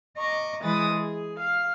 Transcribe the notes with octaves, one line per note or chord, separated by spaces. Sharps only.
D#5 A#5 C#6 D6
E3 G#3 B4 D#6 A6
G#4
F5